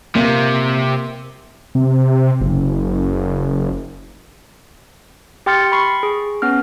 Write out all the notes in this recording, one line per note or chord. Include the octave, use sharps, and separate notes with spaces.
C3 A#3
C3
F#1
G4 G5 C6 F6 A6 C#7
B5 C#6 C7
G#4
B3 C#4 F6